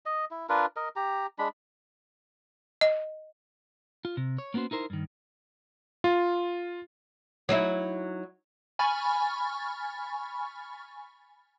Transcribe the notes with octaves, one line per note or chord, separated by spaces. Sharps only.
D#5
E4
D4 F4 A#4 B4
A#4 D#5
G4 A#5
G#3 D4 B5
D#5
F4
C3
C#5
A#3 B3 C#4 F#4 C5
D#4 E4 A#4 C5
G2 D#3
F4
F#3 D#4 E4
G#5 B5 C#6 F6 A6